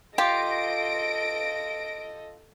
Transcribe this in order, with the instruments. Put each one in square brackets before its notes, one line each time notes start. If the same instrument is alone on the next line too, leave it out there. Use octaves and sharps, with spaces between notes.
[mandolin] F4 [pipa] G4 [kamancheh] A4 D#5 [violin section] A#6 D7